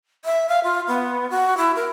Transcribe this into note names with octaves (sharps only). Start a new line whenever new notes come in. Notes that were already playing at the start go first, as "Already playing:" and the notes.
E5
F5
F4
B3
F#4
E4
A#4